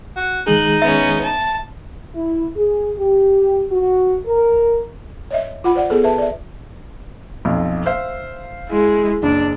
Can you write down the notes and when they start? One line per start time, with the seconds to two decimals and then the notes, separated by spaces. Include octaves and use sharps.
0.16 F#4
0.47 D#3 G#3 D#4 G#4 F#6
0.82 B3 C#4 E5
1.24 A5
2.15 E4
2.57 G#4
2.98 G4
3.71 F#4
4.26 A#4
5.31 C#5 D#5 E5
5.64 F4 F#5 B5
5.75 C5 D5 F#5
5.90 B3 G#4 A4 C5
6.04 B4 E5 A5
6.18 D5 E5
7.45 B1 F2
7.86 C5 E5 F5
8.69 G#3 E4
9.23 F#1 D4